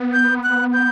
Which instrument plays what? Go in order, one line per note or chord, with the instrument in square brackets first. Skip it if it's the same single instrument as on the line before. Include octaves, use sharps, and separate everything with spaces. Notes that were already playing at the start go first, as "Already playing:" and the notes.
Already playing: [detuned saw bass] B3
[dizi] G6
F#6
G6